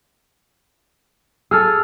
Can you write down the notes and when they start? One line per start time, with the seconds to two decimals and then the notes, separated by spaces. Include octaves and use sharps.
1.51 G#4 A4 E6 F6